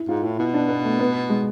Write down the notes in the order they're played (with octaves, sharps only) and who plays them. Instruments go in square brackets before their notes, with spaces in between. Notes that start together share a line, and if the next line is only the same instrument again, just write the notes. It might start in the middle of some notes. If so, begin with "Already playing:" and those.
Already playing: [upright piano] E4
[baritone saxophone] G#2 [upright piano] F4
[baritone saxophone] A2 [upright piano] E4
[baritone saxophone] B2 [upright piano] E4
[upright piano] D4
B3
A3
B3
G#3